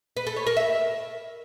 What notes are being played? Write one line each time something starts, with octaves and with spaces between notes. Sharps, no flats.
B4
A4
C#5
A#4
E5